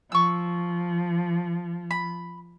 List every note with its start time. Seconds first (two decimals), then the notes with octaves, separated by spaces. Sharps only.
0.12 F3 C#6 E6
1.91 B5